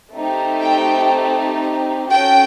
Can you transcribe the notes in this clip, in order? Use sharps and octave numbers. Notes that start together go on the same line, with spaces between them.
A3 C4 D#4 G4
G5
C#4 F#4 A4 G5